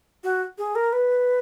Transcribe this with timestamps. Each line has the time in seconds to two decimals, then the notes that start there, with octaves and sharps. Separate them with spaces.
0.24 F#4
0.58 G#4
0.75 A#4
0.93 B4